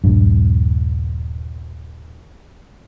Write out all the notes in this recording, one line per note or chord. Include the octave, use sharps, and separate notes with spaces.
D#1 A#1 G2